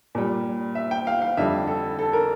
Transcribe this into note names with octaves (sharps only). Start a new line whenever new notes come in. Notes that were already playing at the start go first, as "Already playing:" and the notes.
A#2 G3
E5
G5
F5
F5
F2 D3 G3 E5
A4
A4
A#4